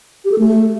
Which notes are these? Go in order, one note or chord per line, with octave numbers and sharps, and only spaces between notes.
G4
A4
A3